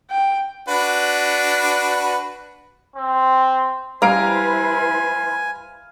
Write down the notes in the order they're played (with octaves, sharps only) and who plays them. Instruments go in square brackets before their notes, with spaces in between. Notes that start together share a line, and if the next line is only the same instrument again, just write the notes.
[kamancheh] G5
[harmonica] D4 F#4 B4
[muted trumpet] C4
[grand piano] G3 A#5 D7 [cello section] E4 B4 C5 [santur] F5 [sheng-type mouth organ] G#5